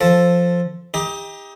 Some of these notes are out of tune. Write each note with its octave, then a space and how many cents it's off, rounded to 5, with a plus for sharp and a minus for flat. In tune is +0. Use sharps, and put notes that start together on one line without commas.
F3 +0 A4 +0
D#4 +30 G4 +35